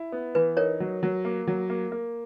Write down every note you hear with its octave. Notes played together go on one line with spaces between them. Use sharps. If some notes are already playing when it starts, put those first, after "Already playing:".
Already playing: E4
B3
E3 B4
D#4 A#4 C#5
F#3
F#3
A#3
F#3
A#3
A#3